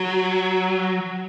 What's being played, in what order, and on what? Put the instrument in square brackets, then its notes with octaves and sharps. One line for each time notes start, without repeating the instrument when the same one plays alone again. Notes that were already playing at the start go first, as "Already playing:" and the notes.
Already playing: [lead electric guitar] F#3